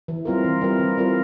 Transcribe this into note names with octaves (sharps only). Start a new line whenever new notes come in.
E3
G3 C4 F4 A#4
E3
G3 C4 F4 A#4
E3
G3 C4 F4 A#4